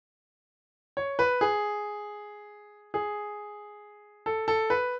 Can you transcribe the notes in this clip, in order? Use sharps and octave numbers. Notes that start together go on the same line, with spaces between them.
C#5
B4
G#4
G#4
A4
A4
B4